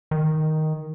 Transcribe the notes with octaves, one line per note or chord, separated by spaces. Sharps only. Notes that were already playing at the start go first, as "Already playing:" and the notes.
D#3